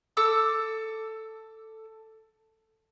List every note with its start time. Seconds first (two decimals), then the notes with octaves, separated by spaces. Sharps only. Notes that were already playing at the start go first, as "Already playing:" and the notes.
0.17 A4 D6 E6